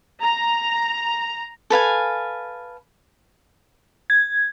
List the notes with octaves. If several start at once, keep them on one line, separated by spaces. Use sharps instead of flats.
A#5
A4 B4 F5 G#5
G#6